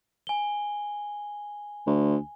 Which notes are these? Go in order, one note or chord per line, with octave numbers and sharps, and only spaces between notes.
G#5 G7
D2